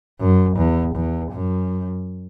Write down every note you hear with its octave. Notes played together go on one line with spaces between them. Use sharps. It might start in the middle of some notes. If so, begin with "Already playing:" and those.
F#2
E2
E2
F#2